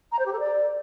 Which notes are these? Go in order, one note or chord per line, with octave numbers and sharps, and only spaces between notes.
A#5
C5
G4
A4
D5